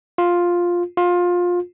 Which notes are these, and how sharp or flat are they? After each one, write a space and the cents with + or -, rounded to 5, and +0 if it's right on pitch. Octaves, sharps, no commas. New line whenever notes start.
F4 +5
F4 +20